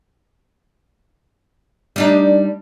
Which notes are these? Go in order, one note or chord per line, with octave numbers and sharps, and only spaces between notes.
G3 D4 D#4